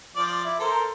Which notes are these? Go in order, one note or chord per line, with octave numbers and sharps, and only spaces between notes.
F3 D5
E4
A4 A#4 C5